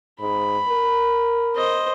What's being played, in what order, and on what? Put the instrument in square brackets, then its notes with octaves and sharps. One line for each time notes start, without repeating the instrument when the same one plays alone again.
[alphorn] G#2 [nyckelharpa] B5
[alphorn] A#4
[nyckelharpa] C5 D#5